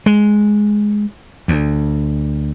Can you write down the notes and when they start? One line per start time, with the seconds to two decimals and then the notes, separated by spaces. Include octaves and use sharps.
0.06 G#3
1.48 D2